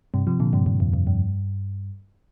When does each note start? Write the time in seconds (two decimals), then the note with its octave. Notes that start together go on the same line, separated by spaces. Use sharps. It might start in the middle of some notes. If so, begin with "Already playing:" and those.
0.14 G2 C3
0.27 C3 F3
0.40 A#2 D3
0.53 G2 C3
0.66 G2
0.80 F2
0.93 F2
1.07 G2